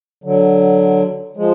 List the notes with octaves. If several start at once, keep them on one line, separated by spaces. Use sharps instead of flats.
D3 F#3
F3 G#3